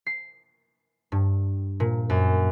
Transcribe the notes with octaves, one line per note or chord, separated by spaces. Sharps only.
C7
G2
A#2
F#2